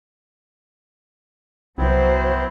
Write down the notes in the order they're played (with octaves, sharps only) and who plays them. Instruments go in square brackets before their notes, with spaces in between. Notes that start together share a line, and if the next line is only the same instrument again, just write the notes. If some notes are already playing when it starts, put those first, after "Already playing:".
[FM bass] C2 [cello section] F#3 C5 [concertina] B3 C4 E4